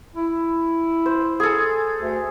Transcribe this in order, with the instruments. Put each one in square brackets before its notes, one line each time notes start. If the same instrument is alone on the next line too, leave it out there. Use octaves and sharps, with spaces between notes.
[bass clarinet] E4
[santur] C5
G#4 A4
[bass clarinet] D2